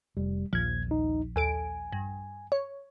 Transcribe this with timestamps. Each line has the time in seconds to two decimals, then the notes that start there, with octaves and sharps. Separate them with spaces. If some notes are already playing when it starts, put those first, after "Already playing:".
0.17 F1 G3
0.53 A#1 D#2 F3 G#6
0.88 D#2 D#4
1.36 D#2 A4 G#5 D7
1.92 G2
2.52 C#5